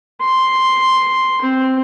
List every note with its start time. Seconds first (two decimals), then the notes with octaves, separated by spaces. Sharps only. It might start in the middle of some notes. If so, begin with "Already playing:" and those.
0.21 C6
1.42 C4